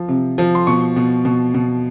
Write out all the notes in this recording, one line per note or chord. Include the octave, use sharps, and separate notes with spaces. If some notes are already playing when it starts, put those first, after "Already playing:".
Already playing: F3
C3
F3
C6
B2 C#6
B2
B2
B2